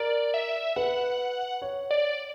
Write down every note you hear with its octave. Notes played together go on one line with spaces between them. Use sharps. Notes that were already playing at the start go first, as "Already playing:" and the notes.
Already playing: A#4 D5
E5
B4 F#5
C#5
D5